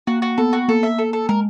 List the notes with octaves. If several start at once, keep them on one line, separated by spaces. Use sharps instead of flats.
A#3 F#4
F#4
B3 A4
F#4
A#3 A4
E5
A4
A4
G#3 A#4